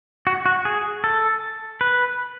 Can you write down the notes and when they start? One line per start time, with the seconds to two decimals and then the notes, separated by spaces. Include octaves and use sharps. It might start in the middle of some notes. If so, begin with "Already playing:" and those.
0.27 F#4
0.46 F#4
0.65 G#4
1.04 A4
1.81 B4